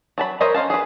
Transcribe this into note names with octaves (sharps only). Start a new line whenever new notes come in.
F#3 A5 B5
A#4 C5 C#5 D#5 E5
C#4 C5 F5 A5
G#4 B4